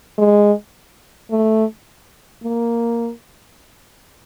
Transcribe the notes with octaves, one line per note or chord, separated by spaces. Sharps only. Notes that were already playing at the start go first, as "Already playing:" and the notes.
G#3
A3
A#3